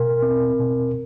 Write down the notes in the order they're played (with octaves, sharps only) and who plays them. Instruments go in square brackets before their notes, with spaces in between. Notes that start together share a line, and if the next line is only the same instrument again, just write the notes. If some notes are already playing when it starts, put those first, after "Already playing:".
Already playing: [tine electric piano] B2 A#4
C4
B2